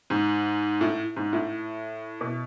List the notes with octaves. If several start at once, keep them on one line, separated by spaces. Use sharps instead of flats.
G#2
A2
G#2
A2
B2